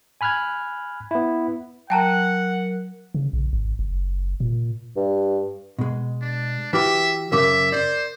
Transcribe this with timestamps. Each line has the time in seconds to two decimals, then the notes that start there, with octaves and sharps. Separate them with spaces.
0.21 G#5 B5 F6 F#6 G#6
1.11 B3 E4
1.90 F#3 A#4 F#5 G5 A5 A#5
3.14 C#3
3.33 A#1
3.53 G#1
3.79 F#1
4.40 A#2
4.96 G2
5.79 B2 G#3
6.22 D4
6.73 E3 F#4 G4 B4 E5 D6
7.32 F#2 C#3 A#4 E5 D6
7.72 C5 D5